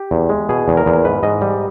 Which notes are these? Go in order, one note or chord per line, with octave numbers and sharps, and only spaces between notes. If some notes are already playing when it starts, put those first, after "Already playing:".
Already playing: G4
E2
G#3
B2 G#4
E2
A#4
E2
G#2 B4
G#2 D#5
G3